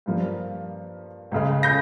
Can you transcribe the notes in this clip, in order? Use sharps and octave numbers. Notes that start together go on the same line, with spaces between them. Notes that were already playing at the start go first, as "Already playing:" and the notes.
G2 F3 A#3
C#2 C#3 G#3
G6 A#6